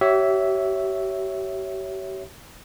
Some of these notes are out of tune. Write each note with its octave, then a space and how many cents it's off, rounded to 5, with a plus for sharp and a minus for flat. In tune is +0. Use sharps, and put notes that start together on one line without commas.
G4 -40 C#5 +0 E5 +0